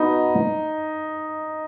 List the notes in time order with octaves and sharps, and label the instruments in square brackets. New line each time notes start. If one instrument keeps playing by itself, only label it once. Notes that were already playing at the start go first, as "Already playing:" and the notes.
Already playing: [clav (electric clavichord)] B3 F#4 B4 D#5 [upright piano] D#4